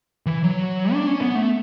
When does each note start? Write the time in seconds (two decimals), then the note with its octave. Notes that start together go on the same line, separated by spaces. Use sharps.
0.26 E3
0.44 F#3
0.93 D4
1.07 C#4
1.22 B3
1.35 A3